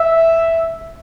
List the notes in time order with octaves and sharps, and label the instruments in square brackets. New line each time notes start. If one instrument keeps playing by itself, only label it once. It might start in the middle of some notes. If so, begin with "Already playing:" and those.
Already playing: [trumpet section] E5